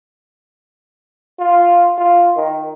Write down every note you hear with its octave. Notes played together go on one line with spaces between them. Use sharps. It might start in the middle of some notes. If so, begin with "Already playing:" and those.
F4
F4
D#3